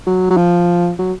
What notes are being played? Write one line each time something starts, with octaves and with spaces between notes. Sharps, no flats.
F#3
F#3
F3
F#3